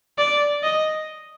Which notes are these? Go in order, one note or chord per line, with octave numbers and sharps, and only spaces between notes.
D5
D#5